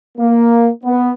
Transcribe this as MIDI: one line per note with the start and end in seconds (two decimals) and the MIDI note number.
0.18 0.69 58
0.84 1.09 59